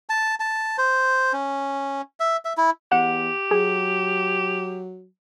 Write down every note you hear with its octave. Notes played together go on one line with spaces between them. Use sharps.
A5
A5
C5
C#4
E5
E5
E4
E2 G4 F#5
F#3 G#4